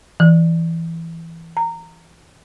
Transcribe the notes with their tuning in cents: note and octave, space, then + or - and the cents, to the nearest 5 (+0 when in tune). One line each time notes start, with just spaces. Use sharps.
E3 +5
A#5 -20